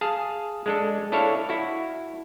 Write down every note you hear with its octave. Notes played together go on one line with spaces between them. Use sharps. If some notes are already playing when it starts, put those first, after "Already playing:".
G#4 F5 A5
G#3 D4 A4
D4 E4 A4 C#5 F5
E4 F#4